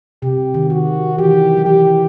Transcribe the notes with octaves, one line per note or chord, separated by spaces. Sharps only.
C3 G4
D#3
D#3 F#4
E3 G4
F#3
E3 G4